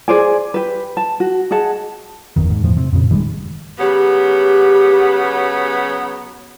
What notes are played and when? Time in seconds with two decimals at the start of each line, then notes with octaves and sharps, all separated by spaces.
0.08 G#4 C5 D5 G#5
0.54 G4 B4
0.97 A5
1.20 F#4
1.51 G#4 D#5 F#5 A5
2.36 F#1 E2 D#3
2.50 G#2
2.64 E2 A2 F3
2.77 C3
2.93 F2 A#2 C#3
3.10 F#1 D#3 G3 G#3
3.79 C#3 F#3 B3 G4